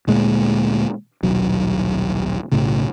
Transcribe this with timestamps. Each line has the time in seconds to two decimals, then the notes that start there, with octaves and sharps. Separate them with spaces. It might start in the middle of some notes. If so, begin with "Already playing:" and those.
0.07 D2 A#2 G#3
1.23 D#1 B1 F#3
2.52 B1 A2 C#3